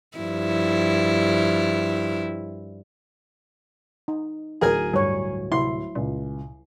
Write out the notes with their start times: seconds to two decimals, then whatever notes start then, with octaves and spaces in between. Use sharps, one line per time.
0.17 G2 F3 E4
4.08 D#4
4.61 D1 A2 G#4 A#4 G#5
4.93 G2 G3 C#5
5.52 C3 E4 C6
5.95 C#2 A#2